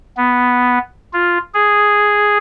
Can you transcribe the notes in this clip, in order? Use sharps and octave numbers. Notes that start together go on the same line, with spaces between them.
B3
F4
G#4